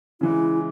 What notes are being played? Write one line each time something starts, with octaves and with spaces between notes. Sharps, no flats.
C#3 E3 G#3 E4